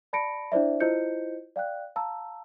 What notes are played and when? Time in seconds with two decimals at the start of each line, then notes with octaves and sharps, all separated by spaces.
0.13 D5 A5 B5 A#6 C#7 D7
0.52 D4 E4 C5 D5 E5
0.80 E4 F4 C5 D#5 G6 C#7
1.56 D5 F5 G5 F#6
1.96 F5 A5 A#5 E6